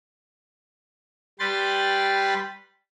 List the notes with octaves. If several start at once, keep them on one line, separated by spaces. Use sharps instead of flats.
G3 B4 G5 B5 C6 A6